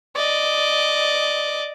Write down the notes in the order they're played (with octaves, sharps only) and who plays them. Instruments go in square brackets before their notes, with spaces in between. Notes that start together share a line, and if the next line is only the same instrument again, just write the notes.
[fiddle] D5 D#5